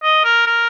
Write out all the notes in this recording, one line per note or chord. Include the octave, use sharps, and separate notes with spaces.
D#5
A#4
A#4